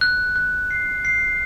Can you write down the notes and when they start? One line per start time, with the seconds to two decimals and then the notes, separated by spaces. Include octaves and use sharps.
0.01 F#6
0.36 F#6
0.71 C7
1.05 C7